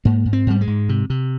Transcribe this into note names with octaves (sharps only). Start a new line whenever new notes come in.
G#2 A#3
G#2
C4
G#2 G3
G#3
G#2
C3
C3